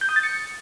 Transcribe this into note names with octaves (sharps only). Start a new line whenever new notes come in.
G6
D#6
A6
C#7